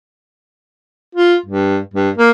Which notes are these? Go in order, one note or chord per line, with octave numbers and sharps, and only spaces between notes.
F4
G2
G2
A#3